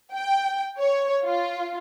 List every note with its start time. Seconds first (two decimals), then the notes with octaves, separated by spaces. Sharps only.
0.13 G5
0.78 C#5
1.24 F4